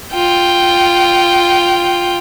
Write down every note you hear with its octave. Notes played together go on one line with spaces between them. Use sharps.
F4 G5